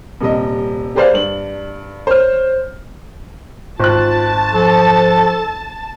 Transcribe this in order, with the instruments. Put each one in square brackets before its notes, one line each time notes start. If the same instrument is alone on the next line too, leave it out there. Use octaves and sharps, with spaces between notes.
[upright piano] D#1 C3 G3 D#5
G4 G#4 B4 C5 D5 F5
G2 D4 F#7
C5 C#5 F6
[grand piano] G#1 F#6 [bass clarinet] F4 [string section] A5
[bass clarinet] F3 [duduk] A4